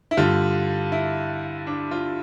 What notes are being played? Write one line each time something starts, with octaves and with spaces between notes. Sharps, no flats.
E4
G2 D3 G3 F4
E4
D4
F4